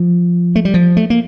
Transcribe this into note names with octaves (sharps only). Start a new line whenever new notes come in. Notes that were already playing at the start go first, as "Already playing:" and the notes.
Already playing: F3
A3
G3
F3
A3
A#3